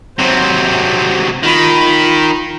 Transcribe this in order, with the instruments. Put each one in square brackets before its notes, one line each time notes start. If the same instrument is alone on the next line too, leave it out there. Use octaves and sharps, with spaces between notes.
[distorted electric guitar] C3 F#3 [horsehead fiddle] C5
[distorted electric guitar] D#3 [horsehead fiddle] F4 B5